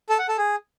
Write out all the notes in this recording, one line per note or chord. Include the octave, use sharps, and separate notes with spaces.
A4
F#5
A4
G#4